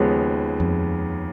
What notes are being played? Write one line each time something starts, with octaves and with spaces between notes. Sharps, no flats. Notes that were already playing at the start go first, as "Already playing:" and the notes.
Already playing: D#2 C#3 F3 G#3 B3
F2